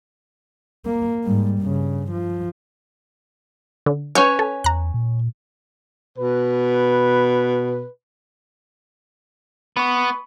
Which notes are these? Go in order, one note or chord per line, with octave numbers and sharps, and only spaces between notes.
A#3
G#2 G3
G2 C#3
F3
D3
C#4 B4 C#5 C#6 G6
A4
E2 A#5 F#6
A#2
B2 B4
B3 B5 C#6